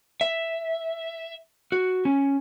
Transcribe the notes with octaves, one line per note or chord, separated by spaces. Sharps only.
E5
F#4
C#4